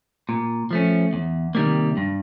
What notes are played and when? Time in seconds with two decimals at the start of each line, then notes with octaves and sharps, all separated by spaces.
0.29 A#2
0.71 F3 A3 C#4
1.13 E2
1.55 C3 D#3 G3 A#3
1.97 G2